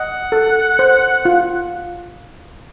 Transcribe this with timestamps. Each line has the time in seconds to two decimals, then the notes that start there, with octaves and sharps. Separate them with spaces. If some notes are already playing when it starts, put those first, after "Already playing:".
Already playing: D#5 F#5
0.32 A4
0.79 C5
1.25 F4